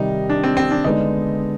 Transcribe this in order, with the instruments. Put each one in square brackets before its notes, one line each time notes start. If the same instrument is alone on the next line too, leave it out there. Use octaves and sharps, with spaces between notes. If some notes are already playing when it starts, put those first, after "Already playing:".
Already playing: [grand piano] C3 D#3 G3 [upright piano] D#4
[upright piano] D4
C4
C4
D4
[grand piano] D3 G#3 B3 D4 [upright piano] D#4